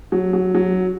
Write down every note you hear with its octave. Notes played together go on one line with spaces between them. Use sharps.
F#3
F#3
F#3